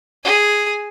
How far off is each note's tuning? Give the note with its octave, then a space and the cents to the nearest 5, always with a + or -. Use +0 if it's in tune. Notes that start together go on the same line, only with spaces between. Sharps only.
G#4 +0 G#5 +0